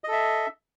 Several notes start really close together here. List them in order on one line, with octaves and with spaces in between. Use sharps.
D#5 A4 E5